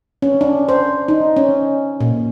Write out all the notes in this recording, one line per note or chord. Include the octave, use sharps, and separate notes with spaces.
C#4
D4
C5
D#4
C#4
A#2